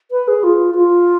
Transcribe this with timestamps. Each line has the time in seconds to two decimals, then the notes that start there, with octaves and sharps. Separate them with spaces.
0.11 B4
0.28 G#4
0.44 F4
0.75 F4